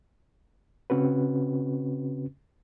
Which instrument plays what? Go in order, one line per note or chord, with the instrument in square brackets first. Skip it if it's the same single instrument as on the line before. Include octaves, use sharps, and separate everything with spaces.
[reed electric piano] C#3 C4 C#4 F#4 B4